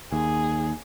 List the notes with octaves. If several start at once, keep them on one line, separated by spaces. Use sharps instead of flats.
D#2 G#4